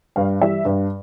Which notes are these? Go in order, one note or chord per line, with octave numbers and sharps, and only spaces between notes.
G2 F5
E3 G3 E5
G2